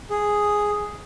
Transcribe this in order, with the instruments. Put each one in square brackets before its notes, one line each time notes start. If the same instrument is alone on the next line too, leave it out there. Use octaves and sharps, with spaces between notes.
[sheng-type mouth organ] G#4